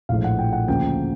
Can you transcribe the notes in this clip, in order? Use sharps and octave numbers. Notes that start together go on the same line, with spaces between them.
A#1 A2 F3 G#3 F5
F#5
G5
F#5
D2 C#3 F3 A#3 G5